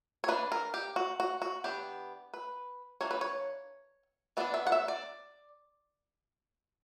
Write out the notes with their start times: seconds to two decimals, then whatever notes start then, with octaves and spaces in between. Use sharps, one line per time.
0.24 C#5
0.28 E3 A#3 D4 B4
0.52 A#4
0.74 G4
0.96 F#4
1.20 F#4
1.42 F#4
1.64 E3 B3 D4 G4
2.34 B4
3.01 E3 A#3 D4 C#5
3.11 B4
3.21 C#5
4.37 E3 B3 D4 D5
4.54 E5
4.67 F#5
4.72 E5
4.88 D5